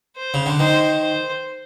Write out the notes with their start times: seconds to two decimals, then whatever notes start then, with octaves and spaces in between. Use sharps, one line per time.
0.16 C5
0.34 C#3
0.46 D3
0.59 D#3 C5
1.01 C5